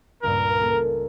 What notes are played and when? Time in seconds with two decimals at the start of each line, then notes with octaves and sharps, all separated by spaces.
0.23 C#2 G2 A#2 A#4
0.61 A#3 G#4 A4